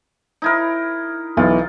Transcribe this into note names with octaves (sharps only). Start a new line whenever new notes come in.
D#4 E4 A#4
B1 E3 F4